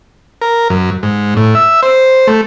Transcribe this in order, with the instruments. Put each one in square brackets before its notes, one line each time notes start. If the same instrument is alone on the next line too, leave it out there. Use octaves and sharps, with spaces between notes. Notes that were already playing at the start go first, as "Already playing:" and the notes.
[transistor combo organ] A#4
F#2
G#2
A2
E5
C5
A3